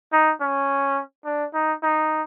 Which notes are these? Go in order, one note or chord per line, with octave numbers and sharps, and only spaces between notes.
D#4
C#4
D4
D#4
D#4